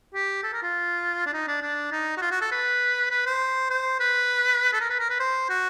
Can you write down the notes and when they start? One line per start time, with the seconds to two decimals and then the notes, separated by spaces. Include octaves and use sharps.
0.15 G4
0.44 A4
0.54 A#4
0.63 F4
1.26 D4
1.34 D#4
1.48 D4
1.62 D4
1.92 D#4
2.17 F#4
2.22 F4
2.31 F#4
2.41 A4
2.52 B4
3.11 B4
3.26 C5
3.70 C5
4.00 B4
4.73 A4
4.81 A#4
4.90 B4
4.99 A#4
5.10 B4
5.20 C5
5.50 F#4